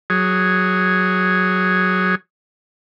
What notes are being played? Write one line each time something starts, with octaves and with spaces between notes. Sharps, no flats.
F#3 G#4